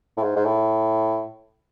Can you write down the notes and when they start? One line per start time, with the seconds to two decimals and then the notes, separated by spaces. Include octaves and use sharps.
0.17 A2
0.23 G#2
0.36 G#2
0.45 A2